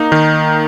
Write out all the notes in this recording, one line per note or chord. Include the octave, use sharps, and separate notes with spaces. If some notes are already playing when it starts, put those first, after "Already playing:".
Already playing: A#3 D#4
D#3